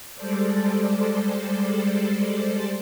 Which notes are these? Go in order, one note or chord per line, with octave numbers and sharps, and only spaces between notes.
G3 G#3 A4 C5 D5